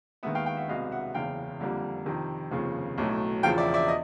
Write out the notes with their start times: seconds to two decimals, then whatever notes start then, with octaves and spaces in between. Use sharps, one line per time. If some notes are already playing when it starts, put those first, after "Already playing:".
0.23 D#2 D#3 G#3 B3 E5 F#5
0.35 F5 G5
0.46 F5 G5
0.57 E5 F#5
0.69 C2 B2 G#3 B3 D#5 F5
0.91 E5 F#5
1.14 F#1 E2 C#3 F5 G5
1.60 F2 D3 G3 A#3
2.06 F2 C3 D#3
2.51 F1 D#2 C#3 F3
2.98 B1 A2 F#3 A3
3.43 E1 E2 C#3 F3 F5 G5
3.58 D5 E5
3.74 D5 E5
3.88 D#5